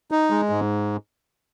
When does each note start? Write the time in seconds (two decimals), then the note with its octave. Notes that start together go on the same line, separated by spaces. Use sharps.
0.11 D#4
0.31 G#3
0.49 G#2